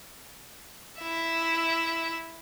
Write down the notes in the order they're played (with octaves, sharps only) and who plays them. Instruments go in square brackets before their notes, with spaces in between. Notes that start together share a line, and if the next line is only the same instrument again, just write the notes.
[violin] E4 E5